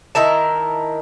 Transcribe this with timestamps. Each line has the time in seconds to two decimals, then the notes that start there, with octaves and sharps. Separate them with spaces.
0.15 D#3 E4 A#4 A5